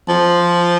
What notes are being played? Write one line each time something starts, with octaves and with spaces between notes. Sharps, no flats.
F3